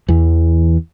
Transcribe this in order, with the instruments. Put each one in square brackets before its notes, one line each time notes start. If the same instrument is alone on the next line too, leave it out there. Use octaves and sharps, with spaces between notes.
[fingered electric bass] E2 E3